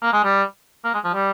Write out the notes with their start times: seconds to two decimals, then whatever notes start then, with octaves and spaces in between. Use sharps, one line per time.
0.02 A#3
0.13 G#3
0.24 G3
0.85 A#3
0.94 G#3
1.04 F3
1.14 G3